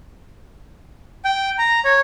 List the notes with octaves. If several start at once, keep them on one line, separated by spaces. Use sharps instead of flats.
G5
A#5
C#5